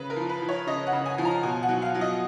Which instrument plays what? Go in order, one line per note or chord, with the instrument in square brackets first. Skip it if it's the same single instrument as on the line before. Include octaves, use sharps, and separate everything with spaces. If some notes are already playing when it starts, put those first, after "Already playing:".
Already playing: [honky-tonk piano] C#3 B4
A#4
F3
B4
F3
C#5
C#3 D#5
F#5
C#3
G#5
F3
A#5
B2 G#5
F#5
F#3
F5
F#3
D#5